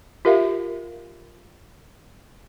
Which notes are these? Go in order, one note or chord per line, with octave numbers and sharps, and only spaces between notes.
F4 G4 A#4 E5 F5